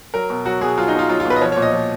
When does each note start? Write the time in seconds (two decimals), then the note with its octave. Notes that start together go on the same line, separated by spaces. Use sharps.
0.14 F#3 A#4
0.30 B2
0.46 F#3 F#4
0.61 B2 G#4
0.77 F#3 F4
0.88 D#4
0.93 B2
0.99 F4
1.09 F#3 F4
1.20 F4
1.25 B2
1.30 B4
1.36 D#5
1.41 F3 C#5
1.52 C#5
1.57 A#2
1.62 D#5
1.73 F3